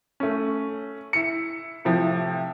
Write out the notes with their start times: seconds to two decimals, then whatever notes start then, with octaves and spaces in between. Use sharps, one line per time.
0.20 A3 C#4
1.13 E4 C#7
1.85 A2 C3 F3